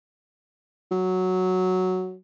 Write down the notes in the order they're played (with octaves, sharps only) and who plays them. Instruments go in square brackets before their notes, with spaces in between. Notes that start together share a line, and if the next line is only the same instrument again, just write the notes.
[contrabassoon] F#3